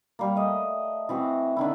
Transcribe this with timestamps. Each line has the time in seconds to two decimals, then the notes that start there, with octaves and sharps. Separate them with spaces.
0.19 G3 A#3
0.36 A3 D#5
1.09 E3 C4 F#4
1.56 D3 D#3 E4